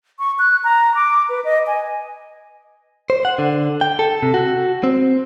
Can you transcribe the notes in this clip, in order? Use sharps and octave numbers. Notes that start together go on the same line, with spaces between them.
C#6
F#6
A#5
D6
B4
D#5
G#5
C5
F#5
D3
G5
A4
C3
F#4
C4